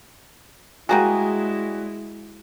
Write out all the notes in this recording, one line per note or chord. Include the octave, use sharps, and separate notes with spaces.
G3 G#3 A#3 E4 F#4 G#4